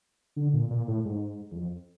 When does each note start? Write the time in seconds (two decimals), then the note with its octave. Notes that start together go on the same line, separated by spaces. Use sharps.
0.36 D3
0.53 A#2
0.70 A#2
0.88 A2
1.05 G#2
1.51 E2
1.56 F2